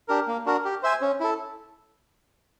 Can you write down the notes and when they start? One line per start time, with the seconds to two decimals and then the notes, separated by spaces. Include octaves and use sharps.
0.08 D4 G4 A#4
0.27 A#3
0.46 D4 F#4 A#4
0.65 G4
0.83 C5 E5 G#5
1.02 C#4
1.20 E4 A4